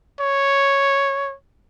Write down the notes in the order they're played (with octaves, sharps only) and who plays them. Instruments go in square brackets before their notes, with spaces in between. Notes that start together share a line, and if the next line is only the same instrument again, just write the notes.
[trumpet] C#5